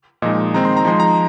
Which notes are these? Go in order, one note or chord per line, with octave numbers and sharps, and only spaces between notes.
A#2 F3 G#3 D#4 D#5
D#3 G#3 C4 D#4 A#5
C6
A#5
F3 G#3 D#4 C6
A#5